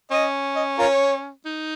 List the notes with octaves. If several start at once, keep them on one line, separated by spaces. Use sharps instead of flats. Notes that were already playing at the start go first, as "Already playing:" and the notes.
C#4 D#5
D#5
F4 A#4 C#5
D#4